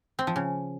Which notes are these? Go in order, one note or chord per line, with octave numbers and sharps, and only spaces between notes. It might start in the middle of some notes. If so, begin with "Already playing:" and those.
C4
F3
C#3